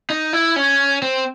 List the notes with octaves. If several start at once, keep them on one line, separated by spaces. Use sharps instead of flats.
D#4
E4
C#4
C4